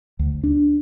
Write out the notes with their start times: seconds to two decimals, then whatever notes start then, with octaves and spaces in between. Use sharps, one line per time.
0.19 D2
0.44 D4